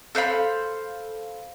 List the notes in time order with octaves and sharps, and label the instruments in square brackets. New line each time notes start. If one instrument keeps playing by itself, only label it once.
[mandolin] A4 C5 F5 B5